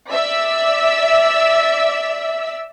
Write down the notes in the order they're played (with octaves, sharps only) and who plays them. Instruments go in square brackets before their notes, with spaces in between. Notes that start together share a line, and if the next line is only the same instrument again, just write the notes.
[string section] D5 E5 E6 B6